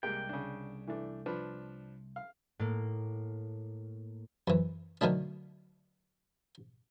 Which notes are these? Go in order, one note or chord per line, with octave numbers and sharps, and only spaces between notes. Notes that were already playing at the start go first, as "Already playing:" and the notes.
C2 G#3 A#3 G4 G5
C#3 D4
E3 A3 D4
F3 D4 B4
F5
A2 A#3
F#2 E3
D3 D#3 F#3 A3 D4